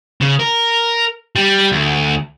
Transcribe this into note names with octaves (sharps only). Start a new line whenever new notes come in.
C#3
A#4
G3
D2